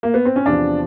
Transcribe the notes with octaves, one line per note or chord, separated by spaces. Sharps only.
A#3
B3
C4
C#4
E2 C3 F3 D4